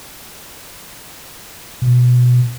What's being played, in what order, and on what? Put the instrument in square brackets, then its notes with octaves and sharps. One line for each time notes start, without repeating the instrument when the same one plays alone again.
[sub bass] B2